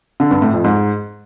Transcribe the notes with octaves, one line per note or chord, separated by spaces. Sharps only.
D3
G2
A2
F2
G#2